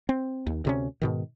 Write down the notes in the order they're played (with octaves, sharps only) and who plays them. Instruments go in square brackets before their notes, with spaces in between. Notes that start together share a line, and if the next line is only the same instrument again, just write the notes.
[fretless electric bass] C4
D#2
D2 C3 C#4
G#2 B2 D#3